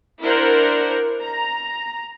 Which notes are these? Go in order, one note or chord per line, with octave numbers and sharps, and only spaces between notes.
D4 E4 A#4 C5 F#5
A#5